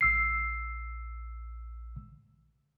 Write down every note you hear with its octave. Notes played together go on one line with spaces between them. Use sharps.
A#1 E6 C7